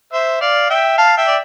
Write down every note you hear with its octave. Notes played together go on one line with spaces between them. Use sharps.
C5 E5
D5 F5
E5 G5
F5 A5
E5 G5
D5